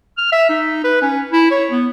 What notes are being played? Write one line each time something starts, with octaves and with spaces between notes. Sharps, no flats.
F6
E5
D#4
B4
C#4
E4
C#5
B3